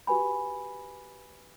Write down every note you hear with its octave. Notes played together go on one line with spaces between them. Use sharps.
F#4 G4 B4 G#5 B5